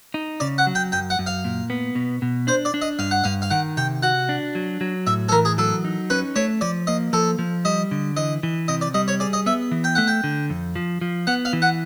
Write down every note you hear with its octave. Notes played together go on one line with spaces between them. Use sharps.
D#4
C#3 D5
F#5
F#3
G5
F#2 G5
F#5
F#2
F5
A#2
B3
B2
B2
D4 C5
D5
D4
D#5
G2 F5
F#5
G2 F5
F5
D#3 F#5
C3 G5
F#4 F#5
D4
F#3
F#3
A2 E5
A4
E3 A#4
G#4
F#3 A4
D#4
C#4 B4
A3 C#5
F3 D5
A#3 D#5
F3 A4
F3
G3 D#5
D3
E3 D#5
E3
C3 D#5
D5
G3 D#5
C#5
G#4 D5
D#5
B3 E5
E3
G5
A3 F#5
G5
D3
F2
F3
F3
B3 F#5
F5
E3
F#5